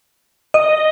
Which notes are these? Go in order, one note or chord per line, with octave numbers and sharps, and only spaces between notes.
D#5